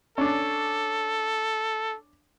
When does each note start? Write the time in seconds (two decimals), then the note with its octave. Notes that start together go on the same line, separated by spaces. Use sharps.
0.18 C#4 D4 A4